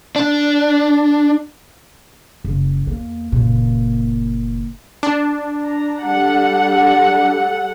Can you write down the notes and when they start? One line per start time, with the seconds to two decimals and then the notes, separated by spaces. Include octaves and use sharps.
0.16 D4
2.45 F#1
2.86 E2 A#3
3.32 F#1 A#2
5.03 D4
5.65 A#5
6.05 G3 A4 F#5